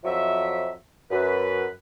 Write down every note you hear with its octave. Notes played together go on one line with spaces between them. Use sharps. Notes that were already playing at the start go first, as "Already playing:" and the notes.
F2 F3 F#3 E5
F#2 B4